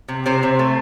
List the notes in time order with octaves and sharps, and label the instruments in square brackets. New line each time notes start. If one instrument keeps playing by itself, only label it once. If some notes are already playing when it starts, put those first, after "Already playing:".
[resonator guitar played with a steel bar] C3
C3 C5
C3
A3